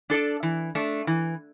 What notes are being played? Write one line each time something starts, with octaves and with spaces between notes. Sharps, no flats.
D4 A4 D5
E3
A3 D4
E3